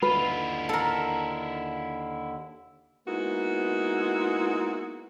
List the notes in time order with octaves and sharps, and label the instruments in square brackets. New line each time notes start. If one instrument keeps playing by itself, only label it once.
[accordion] D#2 D3 [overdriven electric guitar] E4 F4 [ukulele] B4
[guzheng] A4 A#4
[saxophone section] G#3 A#3 B3 D#4 E4 F#4